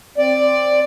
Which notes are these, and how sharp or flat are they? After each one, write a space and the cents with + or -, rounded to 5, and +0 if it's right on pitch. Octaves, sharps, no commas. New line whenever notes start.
C4 +10 D5 +5